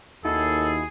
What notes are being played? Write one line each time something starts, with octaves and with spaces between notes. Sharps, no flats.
D#2 D#4 E4 F#4 G#4 A4